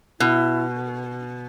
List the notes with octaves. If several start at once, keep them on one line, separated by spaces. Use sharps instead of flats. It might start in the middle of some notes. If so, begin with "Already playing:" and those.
B2 E4